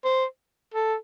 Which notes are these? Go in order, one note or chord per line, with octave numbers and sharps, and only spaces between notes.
C5
A4